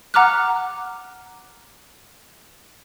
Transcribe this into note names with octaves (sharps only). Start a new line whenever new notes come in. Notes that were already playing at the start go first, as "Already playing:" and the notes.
F#5 A#5 D6 F6 F#6